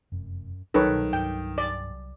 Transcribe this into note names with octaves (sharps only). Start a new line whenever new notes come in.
F1 F#2
C2 D#3 F#3 A4 B4 C#5
B2
G2 G5
D5